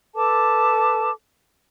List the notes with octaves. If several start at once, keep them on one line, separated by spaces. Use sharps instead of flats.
A4 B4 A5 D6